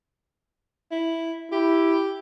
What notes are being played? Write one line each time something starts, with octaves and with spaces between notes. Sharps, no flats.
E4
E4 G4